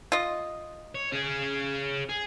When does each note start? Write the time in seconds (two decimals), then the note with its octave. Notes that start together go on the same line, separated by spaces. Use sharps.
0.12 F4 D#5
0.95 C#5
1.12 C#4 G#4
2.09 G#4